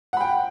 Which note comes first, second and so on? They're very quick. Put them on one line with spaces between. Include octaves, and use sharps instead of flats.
F#5 B5 G5